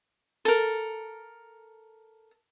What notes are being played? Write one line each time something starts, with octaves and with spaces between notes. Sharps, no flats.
A4 A#4